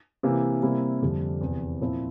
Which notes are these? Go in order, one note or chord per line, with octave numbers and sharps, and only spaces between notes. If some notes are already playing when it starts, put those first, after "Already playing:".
C3 E3 A#3
C3 G3 A#3 E4
F2 D3 G3
E2 C3 E3
A#2 F3 C4 E4